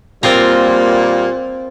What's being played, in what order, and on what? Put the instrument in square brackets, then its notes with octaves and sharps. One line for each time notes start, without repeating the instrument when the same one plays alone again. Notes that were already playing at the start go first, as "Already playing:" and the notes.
[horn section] A#2 G3 A#3 [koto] C4 F4 A#4